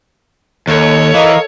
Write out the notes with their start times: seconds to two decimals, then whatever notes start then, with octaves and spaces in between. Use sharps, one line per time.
0.67 D#2 A4 C#5
1.14 E3 A#4 D#5 F5